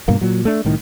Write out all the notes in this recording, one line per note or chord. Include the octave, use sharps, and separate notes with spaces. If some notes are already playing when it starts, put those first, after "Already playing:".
G2 B2 A#3
A#2 F#3
A3 D4
C2 A2 D#3